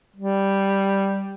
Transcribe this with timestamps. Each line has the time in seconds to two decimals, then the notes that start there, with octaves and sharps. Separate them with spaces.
0.16 G3